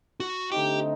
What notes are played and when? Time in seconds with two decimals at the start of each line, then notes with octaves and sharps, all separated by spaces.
0.20 F#4
0.51 D3 A3 C4 D#4 G4